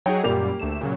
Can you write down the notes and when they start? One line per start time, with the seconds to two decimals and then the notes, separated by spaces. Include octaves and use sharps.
0.06 F#3 D#4 G#4 C#5 G5
0.24 F#2 A#2 G3 A#3 G4 F7
0.60 D2 A3 E7
0.81 A#2 C#3 F#3